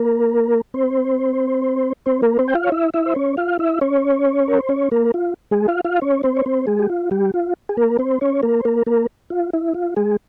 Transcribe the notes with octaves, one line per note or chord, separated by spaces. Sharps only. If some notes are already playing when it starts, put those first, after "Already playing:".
Already playing: A#3 A#4
C4 C5
C4 C5
A#3 A#4
C4 C5
G5
F4 F5
C#5
E4 E5
E4 E5
C5
C#4 C#5
F4 F5
E4 E5
C#4 C#5
A#4
C5
C#4 C#5
A#3 A#4
F4
G#3 G#4
F4 F5
F4 F5
C#4 C#5
C4 C5
C#5
C4 C5
G#3 G#4
G4
F4
G3 G4
F4
G#4
A#3 A#4
C4 C5
C#4 C#5
A#3 A#4
C5
A#3 A#4
A#3 A#4
F4
E4
F4
G#3 G#4